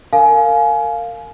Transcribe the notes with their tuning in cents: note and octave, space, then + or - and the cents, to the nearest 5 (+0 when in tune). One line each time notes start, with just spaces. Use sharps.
A#4 -25 F5 +0 G#5 +30